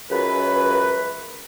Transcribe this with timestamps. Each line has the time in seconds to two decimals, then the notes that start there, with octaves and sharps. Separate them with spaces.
0.11 C#2 F#2 B4